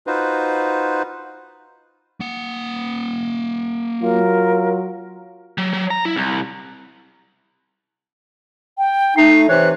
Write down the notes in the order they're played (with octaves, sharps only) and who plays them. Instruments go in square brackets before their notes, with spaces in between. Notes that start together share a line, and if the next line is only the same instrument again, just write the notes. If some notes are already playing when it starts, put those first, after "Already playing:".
[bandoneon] D#4 F4 F#4 B4 C5
[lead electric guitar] A#3 F#5
[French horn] F#3 [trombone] F4 [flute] A#4
[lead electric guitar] F#3
F#3
A#5
E4
C2
[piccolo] G5
[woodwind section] A3 D#4 [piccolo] C7
[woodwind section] C3 E3 C#5 [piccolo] F#6